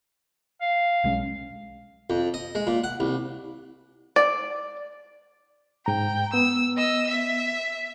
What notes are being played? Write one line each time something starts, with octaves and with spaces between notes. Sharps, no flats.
F5
B1 G#3 C#4
F2
D#5
G#3
A#2
F#5
C2
D5
G#2 G5 A#5
B3 E6
D#5 E6
E5